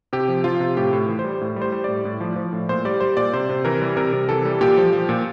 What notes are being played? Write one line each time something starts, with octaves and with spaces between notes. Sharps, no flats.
C3 G4
F3
F3 F4
C3
A2 G4
A2
E3
C5
G3
A2
G3
C5
G3
A2 D5
A2
F3
F3
A2
A#2 C5
G3 D5
G3 C5
A#2 D5
C3 C5
C3
E3 A#4
G3
C3 A#4
C3
E3 A4
G3
A#2 G4
F3
F3
A#2